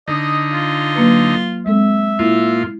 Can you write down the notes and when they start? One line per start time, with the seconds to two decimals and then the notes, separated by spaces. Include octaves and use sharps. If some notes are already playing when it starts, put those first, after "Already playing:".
0.08 D3 D#4 D#5
0.52 F4
0.95 F#3 A#3 B4
1.66 G#3 C4 A4 E5
2.19 A#2 E4 F4